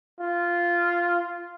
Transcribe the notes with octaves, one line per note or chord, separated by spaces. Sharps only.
F4